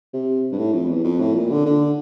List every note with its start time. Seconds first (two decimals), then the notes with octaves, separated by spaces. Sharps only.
0.13 C3
0.52 G2
0.58 A2
0.73 F2
0.89 E2
1.04 F2
1.20 A2
1.34 A#2
1.50 D3
1.65 D3